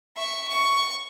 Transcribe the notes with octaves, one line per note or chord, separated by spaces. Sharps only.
E5 C#6
C#6